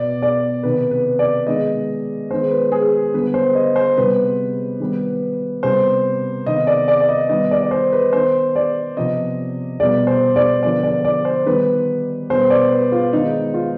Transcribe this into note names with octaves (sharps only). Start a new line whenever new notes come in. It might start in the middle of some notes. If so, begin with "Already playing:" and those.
Already playing: B2 B3 D5
D5
C3 D#3 B3 B4
B4
D5
D#3 G#3 B3 D#5
D#3 G#3 B3 C5
B4
G#4
D3 G3 B3 B4
C5
D#5
C5
C3 G3 B3 B4
D#3 G3 B3
C3 G3 B3 C5
C3 D#3 B3 D#5
D5
D5
D5
D#5
D#3 G3 B3 D#5
D5
D5
C5
B4
D#3 B3 C5
D5
C3 F3 B3 D#5
B2 G3 B3 D5
C5
D5
D3 F3 B3 D5
D5
D5
C5
D#3 G3 B3 B4
B2 G3 B3 C5
D5
B4
F4
D#3 G#3 B3 D#4
F4